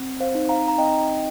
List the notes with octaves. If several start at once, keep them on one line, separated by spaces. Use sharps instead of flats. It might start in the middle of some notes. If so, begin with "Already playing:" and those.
Already playing: C4
C5 F5
D#4
F5 A#5
A#5
C4 D#5 G5